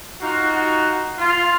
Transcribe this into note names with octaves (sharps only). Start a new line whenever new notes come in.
D#4 F4 F#4
F4